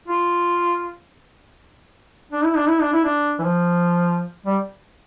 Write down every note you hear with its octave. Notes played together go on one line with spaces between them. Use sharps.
F4
D4
E4
D4
E4
D4
E4
D4
E3
F3
G3